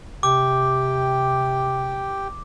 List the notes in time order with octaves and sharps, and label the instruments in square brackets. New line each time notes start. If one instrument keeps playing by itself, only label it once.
[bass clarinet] C3 [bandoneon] G4 G5 [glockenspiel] D6